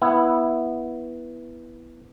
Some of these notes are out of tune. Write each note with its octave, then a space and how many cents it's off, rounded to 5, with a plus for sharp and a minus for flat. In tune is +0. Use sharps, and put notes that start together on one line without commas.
B3 -10 E4 +0